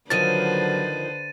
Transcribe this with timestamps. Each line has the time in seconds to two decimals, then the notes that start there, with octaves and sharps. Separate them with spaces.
0.10 D3 D#3 F3 F#3 B4 C5 A6 D#7